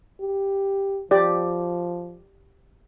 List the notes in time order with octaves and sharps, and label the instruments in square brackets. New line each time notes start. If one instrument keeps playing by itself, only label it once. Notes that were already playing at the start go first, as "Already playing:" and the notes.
[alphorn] G4
[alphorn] F3 [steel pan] G4 D5